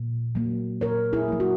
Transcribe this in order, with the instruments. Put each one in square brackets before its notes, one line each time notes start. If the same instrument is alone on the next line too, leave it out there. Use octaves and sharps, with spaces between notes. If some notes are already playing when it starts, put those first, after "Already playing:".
Already playing: [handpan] A#2
F#3 A#3
A#2 A#4 C#5
E4 G#4
F#3 A#3
F#4